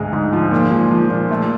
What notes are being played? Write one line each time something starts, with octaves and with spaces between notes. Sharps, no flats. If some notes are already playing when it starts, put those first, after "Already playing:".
Already playing: D2 G#2 G#3
G#2
F3
A#2
G#3
F3
A#2
A3